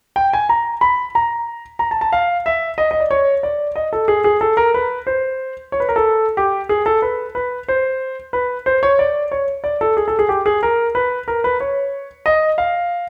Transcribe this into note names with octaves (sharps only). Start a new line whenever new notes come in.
G5
G#5
A#5
B5
A#5
A#5
A5
A5
F5
E5
D#5
D#5
D5
C#5
D5
D#5
A4
G#4
G#4
A4
A#4
B4
C5
C#5
B4
A#4
A4
G4
G#4
A4
B4
B4
C5
B4
C5
C#5
D5
C#5
D5
A4
G#4
A4
G#4
G4
G#4
A#4
B4
A#4
B4
C#5
D#5
F5